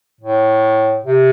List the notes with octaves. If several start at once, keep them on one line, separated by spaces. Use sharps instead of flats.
A2
C3